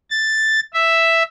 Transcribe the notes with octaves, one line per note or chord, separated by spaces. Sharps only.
A6
E5